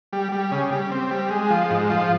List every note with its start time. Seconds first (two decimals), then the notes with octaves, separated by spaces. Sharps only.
0.13 G3
0.32 G3
0.52 C#3
0.72 G3
0.92 C4
1.11 G3
1.30 G#3
1.50 F3
1.70 G#2
1.90 F3